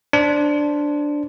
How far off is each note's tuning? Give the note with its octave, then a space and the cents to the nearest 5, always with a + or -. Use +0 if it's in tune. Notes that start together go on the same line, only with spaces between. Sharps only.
D4 +0 C5 +0